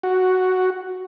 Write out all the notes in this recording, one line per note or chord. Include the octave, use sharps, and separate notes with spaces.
F#4